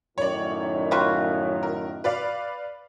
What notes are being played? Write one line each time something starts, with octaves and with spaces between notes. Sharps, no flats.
F#2 A2 D#3 C#5 D5
G3 F4 F#4
A#4
B4 D5 F5